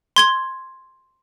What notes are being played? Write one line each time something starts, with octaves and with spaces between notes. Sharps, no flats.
C6 G#6 G7